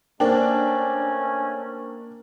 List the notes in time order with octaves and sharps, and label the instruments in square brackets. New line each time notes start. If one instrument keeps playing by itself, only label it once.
[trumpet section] A3 C#4 [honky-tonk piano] A#3 D4 [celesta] C5 G5